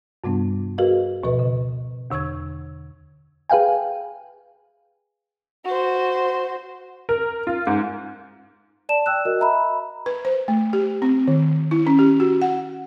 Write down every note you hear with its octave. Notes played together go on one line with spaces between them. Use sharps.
G2 C3 G3 B3 D4
F#4 G#4 A#4 B4 D#5 F5
D2 B2 F3 B4 D#5
C#3
E2 D3 C#6 E6 G#6
G#4 B4 F5 G5 G#5
F#4 C5
A#4
F4
G#2
D5 A5 E7
G5 E6 F#6
F#4 A#4 D#5
D#5 E5 A#5 B5
B4
C5
A3
G4
C4
D#3
E4
C#4
G4
F#4
F#5